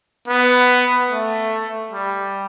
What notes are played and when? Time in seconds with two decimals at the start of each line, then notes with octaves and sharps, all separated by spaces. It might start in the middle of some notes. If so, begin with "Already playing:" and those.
0.28 B3
1.10 A3
1.92 G3